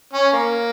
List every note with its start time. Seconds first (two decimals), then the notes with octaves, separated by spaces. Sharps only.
0.13 C#4
0.33 A#3